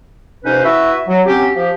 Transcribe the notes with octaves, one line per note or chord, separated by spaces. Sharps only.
F2 C3 C#4 D#4 B4 C5
B3 E4 F#4 B4 E5
F#3
F#3 C4 C#4 G4
F3 G4